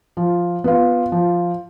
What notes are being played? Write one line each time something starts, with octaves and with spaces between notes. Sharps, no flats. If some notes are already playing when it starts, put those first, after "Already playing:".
F3
B3 F4
F3